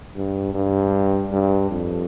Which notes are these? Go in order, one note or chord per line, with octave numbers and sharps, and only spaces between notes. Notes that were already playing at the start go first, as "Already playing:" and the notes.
G2
G2
G2
F2